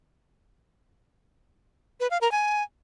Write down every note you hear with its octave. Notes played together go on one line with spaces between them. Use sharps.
B4
F5
A#4
G#5